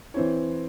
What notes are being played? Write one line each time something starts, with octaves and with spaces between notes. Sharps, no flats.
E3 C4 E4 C#5